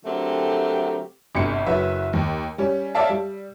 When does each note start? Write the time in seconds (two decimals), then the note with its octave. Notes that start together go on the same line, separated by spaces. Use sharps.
0.05 D3 F#3 A3 C4 G4 A#4
1.35 G1 D2 C3 C#7
1.66 F#1 F#3 B4 E5
2.13 D#2
2.58 G3 C#4
2.95 A4 C#5 D5 E5 F5 A5
3.09 G3